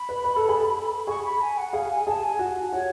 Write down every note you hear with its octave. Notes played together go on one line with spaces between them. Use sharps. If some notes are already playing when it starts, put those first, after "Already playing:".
Already playing: B5
B4
B4
A4
G#4
A4
G#4 C#6
B5
G#5
F#5
G#4 F5
G#5
G#4 A5
G#5
F#4
F#4 C#5